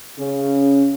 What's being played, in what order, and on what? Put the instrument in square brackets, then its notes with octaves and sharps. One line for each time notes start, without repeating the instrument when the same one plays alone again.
[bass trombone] C#3 [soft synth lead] C#4